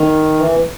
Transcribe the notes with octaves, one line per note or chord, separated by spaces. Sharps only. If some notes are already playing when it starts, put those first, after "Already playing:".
Already playing: D#3
E3